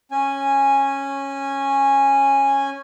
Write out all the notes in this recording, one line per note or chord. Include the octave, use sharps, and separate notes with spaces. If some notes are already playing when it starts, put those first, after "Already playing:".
C#4 G#5